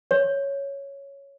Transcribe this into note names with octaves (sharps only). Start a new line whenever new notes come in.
C#5